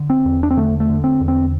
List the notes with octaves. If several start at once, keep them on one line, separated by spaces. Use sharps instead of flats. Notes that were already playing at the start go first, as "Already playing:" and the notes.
Already playing: D3
C4
E2
D4
C4
D3 A3
A3
D3
C4
E2
C4